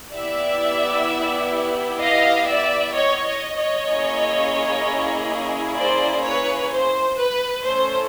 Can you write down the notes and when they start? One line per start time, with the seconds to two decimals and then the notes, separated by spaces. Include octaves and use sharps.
0.13 B3 E4 G4 D5 E5
2.01 D#5 F5
2.49 D5 E5
2.95 C#5 D#5
3.26 C#5 D#5
3.58 C#5 D#5
3.89 A#3 C#4 E4 G#4
5.77 C5 D5
6.23 B4 C#5
6.71 C5
7.17 B4
7.64 A3 C#4 E4 A4 C5